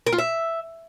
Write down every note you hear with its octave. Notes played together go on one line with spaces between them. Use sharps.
A#4
F4
E5